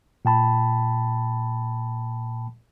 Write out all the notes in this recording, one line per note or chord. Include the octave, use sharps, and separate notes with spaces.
A#2 G5 A5 B5